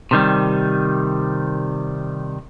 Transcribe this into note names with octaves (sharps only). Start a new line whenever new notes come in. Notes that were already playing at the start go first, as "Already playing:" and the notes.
C3 D#3 G3